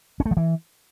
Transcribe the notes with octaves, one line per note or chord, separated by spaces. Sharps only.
C#4
A3
F3
E3